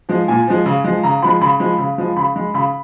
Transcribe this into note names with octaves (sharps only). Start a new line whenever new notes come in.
F3 G#3
A#2 G#5
F3 G#3
C#3
F3 G#3
C#3 A#5
F3 G#3 B5
C#3 B5
F3 G#3
C#3
F3 G#3
C#3 B5
G#3
C#3 B5